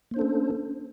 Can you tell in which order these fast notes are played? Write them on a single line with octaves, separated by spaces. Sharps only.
A#3 C5 D4 A4 C#4